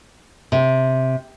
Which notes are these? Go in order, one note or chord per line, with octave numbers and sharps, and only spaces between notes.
C3